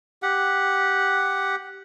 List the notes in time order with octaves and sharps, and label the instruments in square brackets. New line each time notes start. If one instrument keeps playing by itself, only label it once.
[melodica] G4 F#5